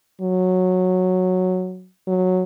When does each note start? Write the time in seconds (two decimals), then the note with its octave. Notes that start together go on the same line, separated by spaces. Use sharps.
0.21 F#3
2.08 F#3